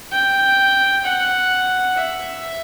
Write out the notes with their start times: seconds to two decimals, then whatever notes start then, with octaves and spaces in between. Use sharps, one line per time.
0.12 G5
1.05 F#5
1.97 E5